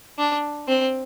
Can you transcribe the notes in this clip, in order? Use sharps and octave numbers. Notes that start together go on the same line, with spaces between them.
D4
C4